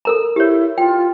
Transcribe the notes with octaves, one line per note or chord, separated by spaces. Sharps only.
A4 A#4 A#5
E4 G4 C#5
F4 G5